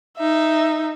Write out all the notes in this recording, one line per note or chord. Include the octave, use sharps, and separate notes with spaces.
D#4 E5